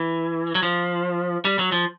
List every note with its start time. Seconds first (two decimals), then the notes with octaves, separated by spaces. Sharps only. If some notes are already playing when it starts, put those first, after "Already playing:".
Already playing: E3
0.55 F#3
0.63 F3
1.45 G3
1.59 F#3
1.72 F3